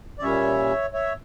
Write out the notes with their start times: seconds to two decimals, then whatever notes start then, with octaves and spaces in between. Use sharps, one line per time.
0.19 D5
0.22 A#2 G3 C#4 C#5 E5
0.93 C#5 E5